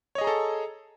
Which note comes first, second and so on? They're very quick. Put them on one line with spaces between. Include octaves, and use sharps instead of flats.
C#5 D#5 G#4 A#5 A4